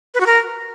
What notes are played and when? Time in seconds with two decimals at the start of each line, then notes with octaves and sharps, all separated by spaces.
0.14 B4
0.20 F#4
0.26 A#4